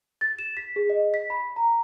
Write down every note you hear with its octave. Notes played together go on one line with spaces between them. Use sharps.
A6
E7
B6
G#4
D#5
B6
B5
A#5